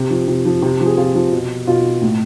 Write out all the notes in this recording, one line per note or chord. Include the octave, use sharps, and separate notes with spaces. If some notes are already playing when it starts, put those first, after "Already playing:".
Already playing: C3
F3
C3
F3
C3
F3
G#4
C3 F4
F3
B2
B2 F4
A2